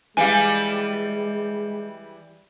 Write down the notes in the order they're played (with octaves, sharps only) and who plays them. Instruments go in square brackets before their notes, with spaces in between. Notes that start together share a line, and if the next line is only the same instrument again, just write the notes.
[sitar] E3 G3 [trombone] G#3 [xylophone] F5 G#5